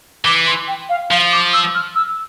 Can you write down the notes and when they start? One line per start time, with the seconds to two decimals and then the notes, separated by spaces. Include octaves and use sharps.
0.25 E3 D6
0.47 C6
0.68 G5
0.89 F5
1.11 F3 F5
1.32 D6
1.53 E6
1.75 F6
1.96 E6